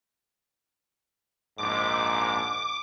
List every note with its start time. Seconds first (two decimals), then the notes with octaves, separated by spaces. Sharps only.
1.58 A#1 G#2 D6